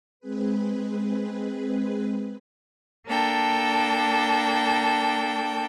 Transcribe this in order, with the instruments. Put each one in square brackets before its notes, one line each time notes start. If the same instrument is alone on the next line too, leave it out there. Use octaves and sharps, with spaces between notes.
[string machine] G#3 C4 G#4 B4
[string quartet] A#3 D4 A4 G5